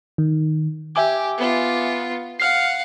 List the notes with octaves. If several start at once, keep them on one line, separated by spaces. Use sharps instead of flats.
D#3
G4 E5 G#5 D6
B3 F4
F5 F#5 F6 C7